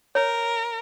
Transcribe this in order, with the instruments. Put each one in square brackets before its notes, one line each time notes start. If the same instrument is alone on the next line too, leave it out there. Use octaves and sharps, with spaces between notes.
[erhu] A#4 [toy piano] C#5